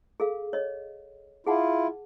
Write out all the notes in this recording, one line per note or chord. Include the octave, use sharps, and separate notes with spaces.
G#4 A4 F5
C#5 D#5
E4 F4 G#4 F#5 A5